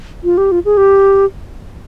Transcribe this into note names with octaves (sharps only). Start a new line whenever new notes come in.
F4
G4
F4
G#4
G4